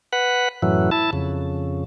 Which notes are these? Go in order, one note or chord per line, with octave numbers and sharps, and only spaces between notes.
B4 F#5
F#2 A2 E3 F#3
E4 A5
F2 C#3